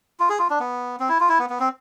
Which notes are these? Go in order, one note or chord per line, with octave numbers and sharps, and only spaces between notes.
F4
G#4
F4
D4
B3
C4
E4
F4
E4
B3
B3
C4